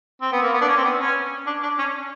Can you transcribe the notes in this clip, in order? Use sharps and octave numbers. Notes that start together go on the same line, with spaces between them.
C4
B3
A#3
B3
D4
C#4
C4
B3
C#4
D4
D4
C#4